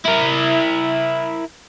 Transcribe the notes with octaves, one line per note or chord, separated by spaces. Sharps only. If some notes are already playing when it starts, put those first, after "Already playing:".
E4 A#4